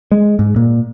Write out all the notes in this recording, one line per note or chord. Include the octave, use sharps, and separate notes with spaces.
G#3
G#2
A#2